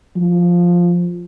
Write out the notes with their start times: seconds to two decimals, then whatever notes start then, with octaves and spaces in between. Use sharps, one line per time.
0.16 F3